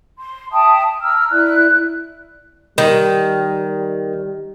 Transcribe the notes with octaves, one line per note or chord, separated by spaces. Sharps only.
C6
E5 G5 A5 D#6
A#5 E6 F6
E4 D5 F#6
D#3 G3